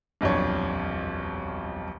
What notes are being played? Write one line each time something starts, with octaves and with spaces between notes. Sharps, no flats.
D#1 B1 F2 D4 C#5